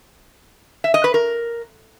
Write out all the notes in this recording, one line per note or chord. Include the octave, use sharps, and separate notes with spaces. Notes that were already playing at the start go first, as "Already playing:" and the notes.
E5
D#5
B4
A#4